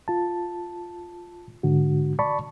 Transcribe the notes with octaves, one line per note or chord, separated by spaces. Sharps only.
F4 A5
G#2 D3 F#4
D5 A5 B5 C#6